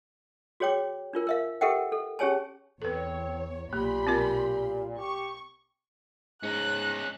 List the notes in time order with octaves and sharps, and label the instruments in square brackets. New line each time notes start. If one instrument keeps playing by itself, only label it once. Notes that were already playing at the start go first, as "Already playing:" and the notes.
[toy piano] F#4 G#4 C#5 G5 D6
D4 F4 A#4
A#4 E5 F5
G4 A4 A#4 E5 F#5 G5
A4
C#4 G4 G#4 C#5 G#5 A5
[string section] E2 C#5 [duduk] C4 [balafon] A4 B4
[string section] B1 B5 C6 [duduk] A#2 [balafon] A#3 [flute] G4
[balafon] C4 F4 A#4
[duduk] G4 [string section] C#6
[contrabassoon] G#2 [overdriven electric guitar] C#4 D#4 [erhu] F#6